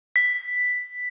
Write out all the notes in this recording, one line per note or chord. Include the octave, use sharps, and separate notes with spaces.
B6